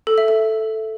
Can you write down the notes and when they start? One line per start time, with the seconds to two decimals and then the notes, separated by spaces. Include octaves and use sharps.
0.07 A4
0.18 E5
0.28 A4